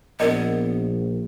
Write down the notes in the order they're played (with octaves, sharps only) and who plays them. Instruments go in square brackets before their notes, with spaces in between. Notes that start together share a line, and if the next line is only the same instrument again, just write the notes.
[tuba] A#1 [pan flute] B3 [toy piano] A#4 D5 D#5